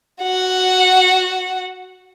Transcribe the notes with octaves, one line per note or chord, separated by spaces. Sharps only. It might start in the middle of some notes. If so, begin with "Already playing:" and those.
F#4 F#5